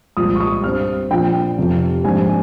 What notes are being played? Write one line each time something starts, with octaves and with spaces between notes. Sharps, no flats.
C2 A#2 F3 G#3 D#6
C#6
D#6
G2 G3 C4 F6
A#1 A#2 F3 G5
F1 F2 C3 F3
A#1 G#2 G3 C4 G#5